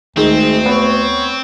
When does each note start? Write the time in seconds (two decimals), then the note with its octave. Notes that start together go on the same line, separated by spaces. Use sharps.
0.17 D2 D#3 G#3 C4
0.66 B3 C#5